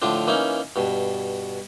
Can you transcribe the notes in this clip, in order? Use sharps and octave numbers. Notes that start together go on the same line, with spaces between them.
A2 D3 F3 D4
E3 A#3 C#4 D#4
G2 B2